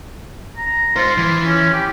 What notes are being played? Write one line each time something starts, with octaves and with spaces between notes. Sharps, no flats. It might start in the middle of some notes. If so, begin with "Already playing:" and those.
A#5
D#4 F4 C5
E3
C#4
G4